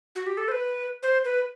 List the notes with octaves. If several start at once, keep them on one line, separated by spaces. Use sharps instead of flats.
F#4
G4
A4
C5
B4
C5
B4